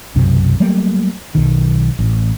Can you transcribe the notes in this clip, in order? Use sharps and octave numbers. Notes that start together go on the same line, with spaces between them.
B1 F#2 C3
F#3 G3 A3 A#3
B1 D#3
A1